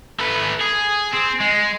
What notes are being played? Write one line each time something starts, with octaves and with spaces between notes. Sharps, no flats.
A3 B4
G#4
C4
G#3